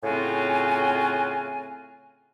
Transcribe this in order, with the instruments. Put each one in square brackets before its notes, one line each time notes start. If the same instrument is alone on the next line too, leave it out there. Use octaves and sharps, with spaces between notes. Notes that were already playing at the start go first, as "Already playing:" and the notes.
[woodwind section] A2 C#3 C4 F4 F#4 G#5